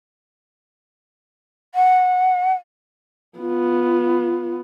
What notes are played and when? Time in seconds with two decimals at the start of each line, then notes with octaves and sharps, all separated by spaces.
1.74 F#5
3.38 B3 F4